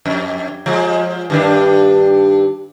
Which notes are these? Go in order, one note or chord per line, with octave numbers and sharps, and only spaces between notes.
F2
F3 G#3
G2 D#3 D4